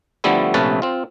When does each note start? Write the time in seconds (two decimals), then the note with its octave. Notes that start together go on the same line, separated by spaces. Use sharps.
0.24 D3 F3 G3 A3 B3 E4
0.54 A#1 C3 A3 C#4 B4 A5
0.82 C4 F4